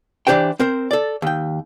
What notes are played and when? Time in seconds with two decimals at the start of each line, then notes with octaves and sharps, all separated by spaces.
0.27 E3 F#3 D4 G4 C5 G5
0.60 C4 A#4 C5
0.91 A4 D5
1.22 D#2 G5